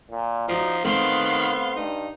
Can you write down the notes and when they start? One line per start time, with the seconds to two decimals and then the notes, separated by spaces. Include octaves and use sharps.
0.11 A#2
0.49 F3 D#4 F#4 D5
0.84 D#3 A3 B3 C4 F5 C6
1.76 G2 D#4